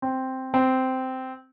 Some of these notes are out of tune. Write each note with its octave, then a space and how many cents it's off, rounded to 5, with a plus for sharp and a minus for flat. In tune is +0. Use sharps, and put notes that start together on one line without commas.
C4 +0
C4 -10